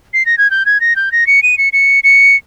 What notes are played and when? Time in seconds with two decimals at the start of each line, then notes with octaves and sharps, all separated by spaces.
0.13 C7
0.26 A#6
0.38 G#6
0.51 G6
0.66 G#6
0.80 A#6
0.96 G6
1.12 A#6
1.27 C#7
1.43 D#7
1.58 C#7
1.73 C#7
2.04 C#7